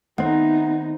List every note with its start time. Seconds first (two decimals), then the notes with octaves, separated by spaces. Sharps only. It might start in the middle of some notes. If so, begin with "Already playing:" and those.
0.18 D#3 A3 B3 C4 D#4 F#5